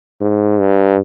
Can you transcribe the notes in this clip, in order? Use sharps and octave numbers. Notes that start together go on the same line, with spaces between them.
G#2
G2